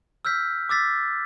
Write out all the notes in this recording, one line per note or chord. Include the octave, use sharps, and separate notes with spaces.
E6 F6 G6 B6
D6 E6 A6 B6